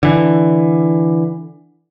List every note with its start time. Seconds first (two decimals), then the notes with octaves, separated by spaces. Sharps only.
0.03 D3 E3